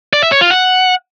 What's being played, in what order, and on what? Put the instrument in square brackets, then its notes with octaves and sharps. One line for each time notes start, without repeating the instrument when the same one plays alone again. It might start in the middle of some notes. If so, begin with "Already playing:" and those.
[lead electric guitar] D5
E5
C#5
F4
F#5